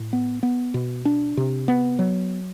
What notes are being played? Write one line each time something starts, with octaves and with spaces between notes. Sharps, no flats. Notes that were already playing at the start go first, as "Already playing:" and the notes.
Already playing: A2
B3
B3
B2
D4
C3
B3
F#3